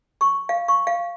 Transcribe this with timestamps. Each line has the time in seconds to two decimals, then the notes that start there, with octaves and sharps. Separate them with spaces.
0.21 C#6
0.49 F5
0.68 C#6
0.87 F5